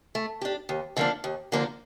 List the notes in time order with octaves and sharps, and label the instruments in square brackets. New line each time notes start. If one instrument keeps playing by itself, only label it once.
[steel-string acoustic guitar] A3
D4 G4
D#2
D3 F3 A#3 D4
D#2
D3 F3 A#3 D4